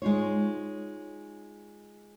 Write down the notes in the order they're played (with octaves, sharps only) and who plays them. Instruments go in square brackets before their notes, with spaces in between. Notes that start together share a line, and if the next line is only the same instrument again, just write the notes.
[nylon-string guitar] G#3 D#4 F4 C#5